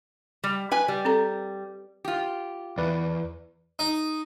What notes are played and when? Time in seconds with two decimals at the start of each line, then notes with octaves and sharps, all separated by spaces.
0.44 G3
0.72 B4 G#5
0.88 G3
1.05 C4 A4 A#5
2.05 F4 G4
2.78 E2 B4 D5
3.79 D#4